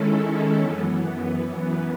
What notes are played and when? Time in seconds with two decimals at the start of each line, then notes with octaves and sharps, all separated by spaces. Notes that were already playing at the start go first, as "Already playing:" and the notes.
Already playing: D#3 G#3 C#4 E4 A4
0.59 F#2 E3 B3